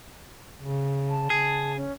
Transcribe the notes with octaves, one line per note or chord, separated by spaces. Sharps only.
C#3
A5
C#3 G#4
C#4